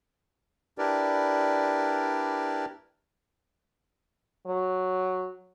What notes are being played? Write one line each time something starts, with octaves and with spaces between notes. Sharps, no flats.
D4 E4 G4 A#4 B4 D5
F#3